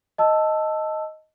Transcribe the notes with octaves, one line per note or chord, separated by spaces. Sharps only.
D#5 A5 E6